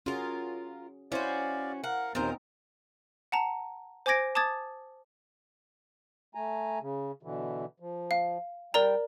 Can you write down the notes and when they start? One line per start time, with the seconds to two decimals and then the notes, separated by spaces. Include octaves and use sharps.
0.06 C#4 F4 F#4 G#4 A#4
1.12 C#4 E4 F#4 C5 D5 F5
1.84 A#4 F5 F#5
2.15 D#2 A#2 B3 C4 D#4 A#4 C5
3.32 F#5 A5 A#5
4.06 C5 G#5 D6 G#6 A#6 D7
4.35 A5 D6 D#6 G#6 A6
6.35 A3 G#5 A#5
6.81 C#3
7.23 B2 D3 E3
7.80 F3
8.11 F5
8.74 G3 A#4 D5 G5 A#5